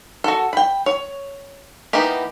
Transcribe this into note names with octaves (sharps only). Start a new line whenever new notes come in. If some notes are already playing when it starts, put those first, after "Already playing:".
F#4 A4
G5 B5
C#5
E3 A#3 B3 D#4 G4